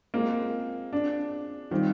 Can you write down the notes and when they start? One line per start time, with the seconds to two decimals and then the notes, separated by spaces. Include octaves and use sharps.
0.14 G#3 A#3 C4 F4 G#4
0.93 D4
1.71 D#3 G3 C4 F4